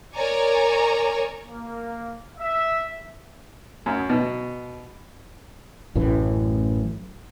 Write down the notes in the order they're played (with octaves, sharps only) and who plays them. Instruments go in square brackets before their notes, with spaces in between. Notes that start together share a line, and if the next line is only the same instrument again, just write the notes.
[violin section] A#4 C#5 D5 G#5 A#5 C#6
[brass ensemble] A#3
E5
[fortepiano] F#2
B2
[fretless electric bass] A1 F#2 A2 E3